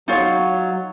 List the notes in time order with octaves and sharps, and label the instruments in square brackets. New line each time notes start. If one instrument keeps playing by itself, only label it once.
[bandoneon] F#3 [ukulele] D#4 F4 C#5